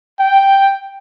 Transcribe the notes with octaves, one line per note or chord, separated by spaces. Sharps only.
G5